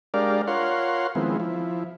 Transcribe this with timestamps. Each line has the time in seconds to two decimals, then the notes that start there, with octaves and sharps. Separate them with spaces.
0.14 G#3 D4 G4 A#4 D5 F5
0.47 F4 A#4 C#5 F5 F#5 C6
1.15 D#3 F3 G#3 B3 C4 E4
1.40 F3 E4